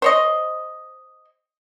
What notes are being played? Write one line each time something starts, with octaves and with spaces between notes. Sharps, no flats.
C5 C#5 D#5